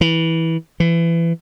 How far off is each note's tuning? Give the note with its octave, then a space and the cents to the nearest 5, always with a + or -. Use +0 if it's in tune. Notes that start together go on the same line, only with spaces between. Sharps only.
E3 -15
E3 +25